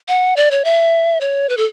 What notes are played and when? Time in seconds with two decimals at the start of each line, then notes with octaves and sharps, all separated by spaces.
0.08 F#5
0.36 D5
0.51 C#5
0.65 E5
1.21 C#5
1.49 B4
1.57 A4